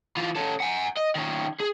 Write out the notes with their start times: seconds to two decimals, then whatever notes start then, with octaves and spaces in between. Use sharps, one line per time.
0.17 E3 F4
0.36 C#4 A4
0.61 F#5 G#5
0.97 D#5
1.15 D#3 C#4
1.60 G#4